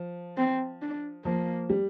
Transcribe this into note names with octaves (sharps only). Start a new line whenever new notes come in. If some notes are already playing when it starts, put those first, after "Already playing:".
Already playing: F3
C4
D4
F3 A#3
G3